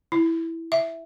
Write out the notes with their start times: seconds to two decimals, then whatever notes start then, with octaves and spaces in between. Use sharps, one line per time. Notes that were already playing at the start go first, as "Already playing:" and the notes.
0.12 E4
0.72 E5